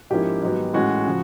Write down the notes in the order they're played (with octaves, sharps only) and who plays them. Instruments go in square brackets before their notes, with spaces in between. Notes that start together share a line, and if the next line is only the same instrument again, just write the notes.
[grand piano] G#2 F3 A#3 C#4 E4 G4
G#2 D#3 F#3 B3
A2 E3 G#3 C#4 F#4
C#3 F3